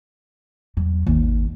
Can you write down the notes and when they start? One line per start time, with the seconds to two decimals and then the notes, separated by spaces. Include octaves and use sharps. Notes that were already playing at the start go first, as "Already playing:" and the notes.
0.77 E2 F#3
1.07 G#1 D#2